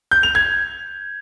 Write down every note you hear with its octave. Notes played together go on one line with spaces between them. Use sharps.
G6
F7
G#6